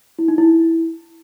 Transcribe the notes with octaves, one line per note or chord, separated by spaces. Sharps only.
E4
D#4
E4